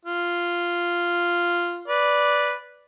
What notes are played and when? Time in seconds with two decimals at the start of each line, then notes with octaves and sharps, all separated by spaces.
0.05 F4
1.88 B4 D5